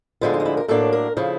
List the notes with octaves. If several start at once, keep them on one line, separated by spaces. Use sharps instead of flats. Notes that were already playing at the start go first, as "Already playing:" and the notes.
D2 D3 F3 G#3 B3 F4
D#4
F4
E4
A#4
A2 F#3 A#3 D4 A4
A#4
C#3 F3 E4